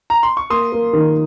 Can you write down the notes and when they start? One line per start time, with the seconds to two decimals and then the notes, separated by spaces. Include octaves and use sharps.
0.10 A#5
0.23 C6
0.37 C#6
0.50 A#3 C6 D#6
0.72 A#3
0.93 D#3